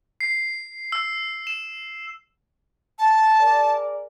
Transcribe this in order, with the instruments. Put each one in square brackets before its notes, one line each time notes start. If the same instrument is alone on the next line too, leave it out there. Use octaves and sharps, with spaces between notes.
[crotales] C7
E6
E7
[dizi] A5
[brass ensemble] G#4 A#4 D5